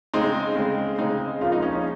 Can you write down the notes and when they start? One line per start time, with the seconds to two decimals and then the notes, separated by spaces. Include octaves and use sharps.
0.14 C#3 G#3 C4 D#4
0.56 C#3 G#3 C4
0.98 C#3 G#3 C4 D#4
1.41 C#3 F3 A#3 F4
1.52 D#4
1.62 C#4
1.73 D#4